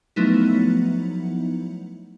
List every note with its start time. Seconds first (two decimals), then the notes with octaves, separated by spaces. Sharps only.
0.16 F3 F#3 A3 B3 D#4 E4